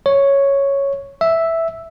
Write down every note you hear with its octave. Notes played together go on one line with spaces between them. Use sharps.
C#5
E5